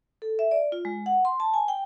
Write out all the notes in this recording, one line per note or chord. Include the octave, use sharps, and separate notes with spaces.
A4
E5
D5
F4
G#3
F#5
C6
A5
G#5
G5